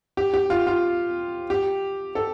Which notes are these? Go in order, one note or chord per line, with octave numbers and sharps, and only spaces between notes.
G4
G4
F4
F4
G4
A4